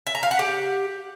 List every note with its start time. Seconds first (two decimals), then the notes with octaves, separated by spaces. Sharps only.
0.07 E5
0.15 A#5
0.23 F5
0.31 F#5
0.39 G4